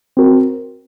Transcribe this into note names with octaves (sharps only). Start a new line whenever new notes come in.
C4 F#4 A#4